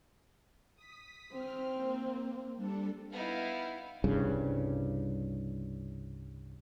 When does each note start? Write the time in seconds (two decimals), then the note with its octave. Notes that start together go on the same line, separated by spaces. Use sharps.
0.75 D#6 B6
1.33 C4 F6
1.75 A#3
2.56 G3 D4 A4
3.12 B3 D#4 E4 F5
4.04 C2 G2 C#3